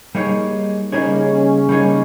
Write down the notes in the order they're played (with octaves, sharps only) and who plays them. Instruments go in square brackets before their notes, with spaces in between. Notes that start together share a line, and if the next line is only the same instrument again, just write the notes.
[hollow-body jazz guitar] G3 A#3 D#4 G#4 C#5
[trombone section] C#3 C#4 [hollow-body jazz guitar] G3 A#3 D#4 G#4 C#5
[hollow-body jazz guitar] G3 A#3 D#4 G#4 C#5